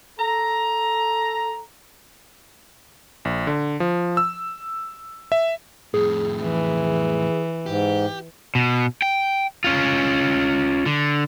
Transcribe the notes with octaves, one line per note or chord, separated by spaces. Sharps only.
A4 A#5
A#1
D3
F3
E6
E5
F2 A2 G#4
E3
G#2 G4
B2
G5
C#4 F4
D3